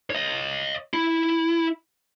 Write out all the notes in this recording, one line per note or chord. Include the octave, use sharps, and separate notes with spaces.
C#5 D#5
E4